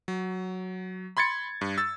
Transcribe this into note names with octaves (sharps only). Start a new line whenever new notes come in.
F#3
B5 C6 G#6 A6 C#7
G2
E6 A6